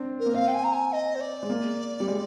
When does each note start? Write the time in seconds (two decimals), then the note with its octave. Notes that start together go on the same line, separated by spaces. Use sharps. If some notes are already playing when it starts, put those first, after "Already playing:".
Already playing: C4 D4
0.19 A#4
0.26 A#3
0.34 C4 F5
0.48 G5
0.54 G#5
0.64 A#5
0.73 G#5
0.92 D#5
1.15 C5
1.20 D5
1.43 G#3
1.49 A#3
2.00 G3
2.08 G#3